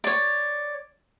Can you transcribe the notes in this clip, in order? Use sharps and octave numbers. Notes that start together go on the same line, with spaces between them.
C#5 D5